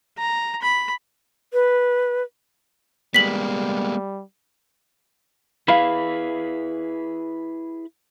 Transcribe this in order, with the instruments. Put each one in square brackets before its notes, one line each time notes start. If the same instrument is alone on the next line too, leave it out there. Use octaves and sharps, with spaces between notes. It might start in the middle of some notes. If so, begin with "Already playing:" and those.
[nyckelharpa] A#5
B5
[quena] B4
[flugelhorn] G3 [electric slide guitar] G#3 A#3 B3 [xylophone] B6 F#7
[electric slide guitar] E4 G#4 B4 [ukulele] F5 B5